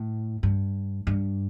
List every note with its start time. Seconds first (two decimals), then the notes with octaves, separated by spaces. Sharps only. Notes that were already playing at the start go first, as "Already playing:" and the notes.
Already playing: A2
0.43 G2
1.07 G2